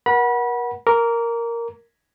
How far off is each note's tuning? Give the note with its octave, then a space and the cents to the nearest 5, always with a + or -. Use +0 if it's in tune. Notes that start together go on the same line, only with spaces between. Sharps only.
A#4 +40 F#5 +0 B5 -30
A#4 +0 D6 -30